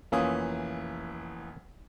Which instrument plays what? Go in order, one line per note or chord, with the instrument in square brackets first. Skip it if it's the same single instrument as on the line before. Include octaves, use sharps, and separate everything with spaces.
[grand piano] F1 E3 D#6 [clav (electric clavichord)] A#3 C#4 F4